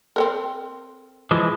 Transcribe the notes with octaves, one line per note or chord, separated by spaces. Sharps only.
C4 A4 A#4
E3 F3 G#3